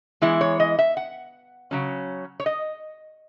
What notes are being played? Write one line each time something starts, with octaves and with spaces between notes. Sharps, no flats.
E3 G#3 B3 E4
C#5
D#5
E5
F#5
C#3 F#3 C#4
C#5
D#5